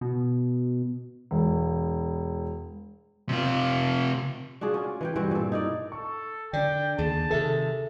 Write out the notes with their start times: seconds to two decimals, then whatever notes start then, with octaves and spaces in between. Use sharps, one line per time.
0.01 B2
1.31 E1
3.29 C3 F4
4.61 D4 F4 F#4 G#4
4.74 C#4 D4
5.01 E3 B4 G5
5.16 G2 E3 C4 F#4
5.31 A#2 A4
5.52 D#4 E4 D5
5.92 A4 C#6
6.53 D3 D4 D5 G5
6.98 D#2 G#4 A5
7.31 C3 D#3 G#4 A4 E5